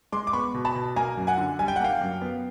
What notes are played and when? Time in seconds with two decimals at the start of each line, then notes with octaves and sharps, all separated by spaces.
0.12 G#3 C6 D6
0.27 D6
0.33 B3 B5 C#6
0.54 B2
0.65 A5 B5
0.75 B2
0.96 A#3 G#5 A#5
1.17 F#2
1.27 F#5 G#5
1.38 D3
1.59 G3 G#5
1.68 G5
1.76 F#5
1.80 A#3 F5 G5
2.01 F#2
2.22 B3